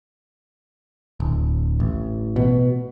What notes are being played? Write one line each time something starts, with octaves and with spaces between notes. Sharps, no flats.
D1
A1
B2